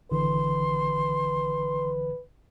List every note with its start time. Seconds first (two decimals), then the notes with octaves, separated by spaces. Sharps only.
0.11 A1 D3 E3 B4 C6